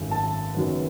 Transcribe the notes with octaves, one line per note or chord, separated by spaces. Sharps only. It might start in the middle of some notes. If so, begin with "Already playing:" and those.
Already playing: G#1 F#2 D#3 A3
A5
F#1 F#2 D#3 F#3 B3